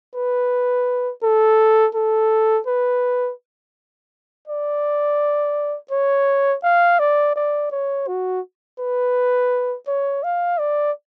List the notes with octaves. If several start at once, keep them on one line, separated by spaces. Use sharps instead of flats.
B4
A4
A4
B4
D5
C#5
F5
D5
D5
C#5
F#4
B4
C#5
F5
D5